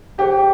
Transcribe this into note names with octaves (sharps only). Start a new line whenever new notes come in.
D4 G4 G#4 C5 G5